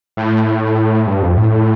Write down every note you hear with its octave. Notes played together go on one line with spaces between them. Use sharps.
A2
G2
F2
A2